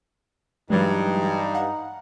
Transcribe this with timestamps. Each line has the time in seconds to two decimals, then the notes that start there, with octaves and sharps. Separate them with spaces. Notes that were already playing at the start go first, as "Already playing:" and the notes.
0.70 G2 E3 F#3 G#3 D#4
1.54 F5 F#5 A#5